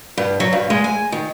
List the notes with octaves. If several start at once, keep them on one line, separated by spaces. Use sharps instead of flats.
G2
F#3
G2
G#3
G#5
D#3